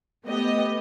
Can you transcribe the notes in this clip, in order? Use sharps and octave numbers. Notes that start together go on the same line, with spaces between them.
A3 B3 G4 D#5